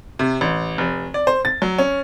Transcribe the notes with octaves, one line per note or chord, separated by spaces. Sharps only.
C3
A1
F1
D5
C5
A6
F#3
C#4